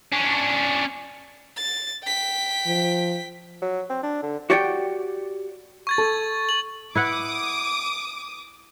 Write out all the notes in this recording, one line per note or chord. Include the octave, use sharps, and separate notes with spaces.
C#4 D4
A6
G5 B6
F3
F#3
C4
D4
D3
F#4 G4 C#5 D5 F#5 G5
C#6 G#6 A6
A4
F#7
E4 B4 F#5 D6 D#6